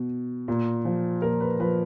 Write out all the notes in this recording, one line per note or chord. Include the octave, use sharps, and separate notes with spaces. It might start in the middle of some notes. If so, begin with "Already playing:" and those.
Already playing: B2
A#2
F3
A#2 A#4
B4
F3 B4